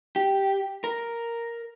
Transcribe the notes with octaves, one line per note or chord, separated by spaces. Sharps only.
G4
A#4